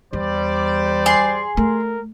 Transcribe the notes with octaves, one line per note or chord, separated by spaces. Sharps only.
E2 G3 C5 D5
G#4 C6
A3 A#4